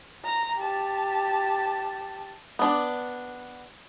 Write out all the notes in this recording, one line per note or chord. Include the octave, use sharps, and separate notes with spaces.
A#5
G4 A5
B3 D4